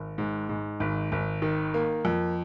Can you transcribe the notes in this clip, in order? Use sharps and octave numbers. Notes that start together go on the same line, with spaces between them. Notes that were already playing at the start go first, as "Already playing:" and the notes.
Already playing: G#1
G#2
G#2
G#1
G#1
D#3
A#3
F2